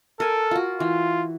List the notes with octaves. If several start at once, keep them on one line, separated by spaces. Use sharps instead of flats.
A4 A#4 G#5
F4 F#4
E3 F4